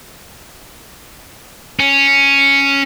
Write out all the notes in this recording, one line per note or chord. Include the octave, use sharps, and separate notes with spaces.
C#4